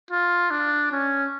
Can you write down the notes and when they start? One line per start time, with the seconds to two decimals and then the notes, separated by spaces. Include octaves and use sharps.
0.10 F4
0.50 D4
0.91 C#4